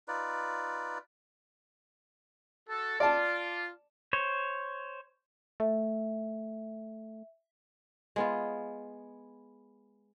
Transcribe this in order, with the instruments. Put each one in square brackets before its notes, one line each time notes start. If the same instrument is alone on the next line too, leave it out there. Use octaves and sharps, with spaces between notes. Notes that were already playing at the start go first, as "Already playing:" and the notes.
[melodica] D#4 F4 B4 D5
[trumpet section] F#4 A4
[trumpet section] F4 [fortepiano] D5 A5
[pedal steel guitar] C5 C#5
[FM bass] A3 [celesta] E5
[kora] G#3 B3 F4